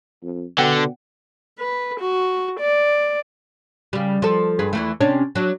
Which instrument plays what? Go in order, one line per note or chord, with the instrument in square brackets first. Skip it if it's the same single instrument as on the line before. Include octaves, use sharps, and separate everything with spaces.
[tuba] F2
[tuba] B2 [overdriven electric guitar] D3 [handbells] F#5 G5
[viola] B4
F#4
D5
[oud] C#3 G3
F3 A4
G2 G#4 B4
E2 E3 A3
C3 C#4 D4
F#3 D4